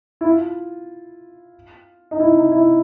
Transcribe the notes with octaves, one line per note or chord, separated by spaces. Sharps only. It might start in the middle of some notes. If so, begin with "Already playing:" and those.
E4
F4
D#4
E4
D#4
E4